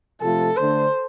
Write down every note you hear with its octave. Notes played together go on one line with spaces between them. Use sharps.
C3 F3 A3 F4 A4
D3 A3 D4 C5